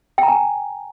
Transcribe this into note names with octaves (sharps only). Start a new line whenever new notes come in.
G5
A#5
G#5